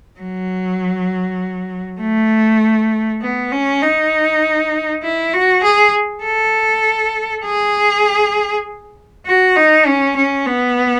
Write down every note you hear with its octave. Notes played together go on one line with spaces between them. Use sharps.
F#3
A3
B3
C#4
D#4
E4
F#4
G#4
A4
G#4
F#4
D#4
C#4
C#4
B3